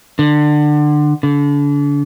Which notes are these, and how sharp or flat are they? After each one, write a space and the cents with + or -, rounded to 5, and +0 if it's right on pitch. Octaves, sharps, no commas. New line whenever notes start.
D3 +25
D3 -35